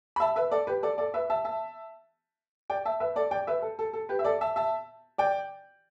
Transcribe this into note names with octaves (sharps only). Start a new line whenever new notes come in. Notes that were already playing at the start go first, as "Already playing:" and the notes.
B5
E5 A5
B4 E5
A4 D5
G4 B4
A4 D5
A4 D5
B4 E5
E5 A5
E5 A5
D5 G5
E5 A5
B4 E5
A4 D5
D5 G5
B4 E5
A4
A4
A4
G4 B4
E5
A4 D5
E5 A5
E5 A5
D5 G5